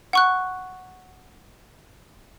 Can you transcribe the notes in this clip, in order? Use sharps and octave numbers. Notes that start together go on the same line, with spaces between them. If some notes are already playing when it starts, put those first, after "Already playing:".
F#5 C#6 F#6